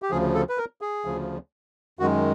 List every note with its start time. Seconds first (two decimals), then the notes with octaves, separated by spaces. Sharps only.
0.02 G4
0.11 D2 C#3 F3 G#4
0.35 A4
0.49 B4
0.58 A#4
0.81 G#4
1.05 D2 C#3 F3
1.99 F#2 D#3 G#3 F#4